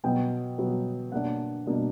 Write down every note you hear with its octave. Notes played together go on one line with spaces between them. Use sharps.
B2 F#3 B3 G5
B2 F#3 B3
B2 A#3 D4 F#5
B2 A#3 D4